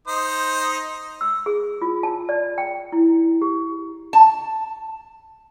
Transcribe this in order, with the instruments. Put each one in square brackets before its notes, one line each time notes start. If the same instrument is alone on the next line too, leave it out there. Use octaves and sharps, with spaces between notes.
[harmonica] D#4 C5 D#6
[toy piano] E6
G#4
F4
A5
D5
G5
E4
G4
[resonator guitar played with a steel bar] A5